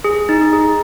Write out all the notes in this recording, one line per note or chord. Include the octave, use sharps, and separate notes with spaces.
G#4
D#4
G#4